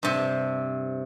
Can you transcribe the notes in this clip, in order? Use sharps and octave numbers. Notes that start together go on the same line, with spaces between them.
G2 C3